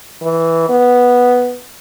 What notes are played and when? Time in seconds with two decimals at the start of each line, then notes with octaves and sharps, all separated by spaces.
0.22 E3
0.70 B3